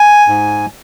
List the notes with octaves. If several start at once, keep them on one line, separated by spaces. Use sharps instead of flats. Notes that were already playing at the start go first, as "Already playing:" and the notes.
Already playing: G#5
G#2